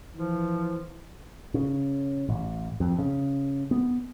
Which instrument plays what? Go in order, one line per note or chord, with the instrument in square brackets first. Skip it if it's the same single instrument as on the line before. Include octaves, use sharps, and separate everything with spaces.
[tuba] E3 [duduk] F3
[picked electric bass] C#3
A1
F2
C#3
B3